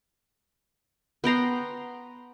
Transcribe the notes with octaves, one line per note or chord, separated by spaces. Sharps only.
B3 G5 A#5 C6